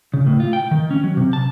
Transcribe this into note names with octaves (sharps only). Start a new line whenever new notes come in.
C#3
A2
F4
G5
D#3
C#4
F#3
C3
A5